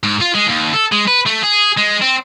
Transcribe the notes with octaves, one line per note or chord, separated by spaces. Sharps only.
G#2
F4
G#3
D#2
A4
G#3
B4
A3
G#4
G#3
C4